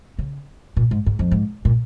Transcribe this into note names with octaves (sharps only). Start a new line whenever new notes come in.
C#3
A#2
G#2
G#2
F2
G#2
A#2